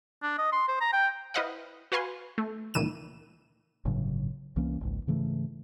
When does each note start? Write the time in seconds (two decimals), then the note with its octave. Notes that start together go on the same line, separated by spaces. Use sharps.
0.22 D4
0.38 D#5
0.52 C6
0.68 C5
0.81 A#5
0.93 G5
1.34 E4 B4 C5 D#5 F5 F#5
1.92 F#4 B4 F5 G#5 C6
2.38 A3
2.74 C#2 A#2 D#3 E3 D#7 E7
3.85 G1 A2 C#3 F#3
4.56 C2 E3 A#3 C#4
4.81 G#1 C#2 G#2
5.07 G#2 C#3 E3 A3